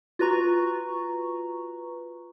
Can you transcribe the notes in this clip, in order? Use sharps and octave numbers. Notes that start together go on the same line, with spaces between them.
F4 F#4 B4 A#5 C#6